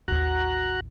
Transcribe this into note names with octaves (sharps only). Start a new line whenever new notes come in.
A1 D#2 F#4 A#5 F#6